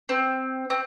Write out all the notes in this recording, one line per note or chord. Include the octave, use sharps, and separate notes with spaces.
C4
C4